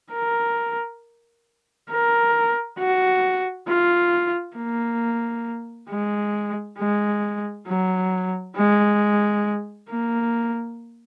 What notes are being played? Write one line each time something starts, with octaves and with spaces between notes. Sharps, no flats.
A#4
A#4
F#4
F4
A#3
G#3
G#3
F#3
G#3
A#3